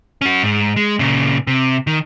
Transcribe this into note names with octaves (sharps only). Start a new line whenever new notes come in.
C#4 F#4
G#2
G#3
A#2 C#3
C3
D#3